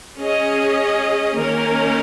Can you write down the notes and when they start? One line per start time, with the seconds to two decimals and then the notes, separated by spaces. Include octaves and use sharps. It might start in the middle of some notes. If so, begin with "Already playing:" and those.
0.19 C#4 G#4 D#5
1.37 D#3 A#3 C#4 A#4